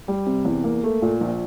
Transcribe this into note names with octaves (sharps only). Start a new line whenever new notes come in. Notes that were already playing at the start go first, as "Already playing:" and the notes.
G3
C3
E2
A#3
A3
A#2
A#1